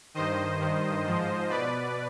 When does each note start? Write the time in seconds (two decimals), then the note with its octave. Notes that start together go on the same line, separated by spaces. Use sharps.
0.14 G2 D#3 C5 D#5
0.59 G2 D#3
1.04 G#2 F3
1.49 B2 B4 D5